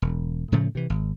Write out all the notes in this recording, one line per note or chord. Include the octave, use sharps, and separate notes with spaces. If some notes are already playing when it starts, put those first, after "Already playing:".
E1
A2 C#3 F3 A3
C3 E3
G#1